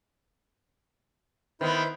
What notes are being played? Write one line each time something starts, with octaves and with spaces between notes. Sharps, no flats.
D#3 B3 E4 B4 C5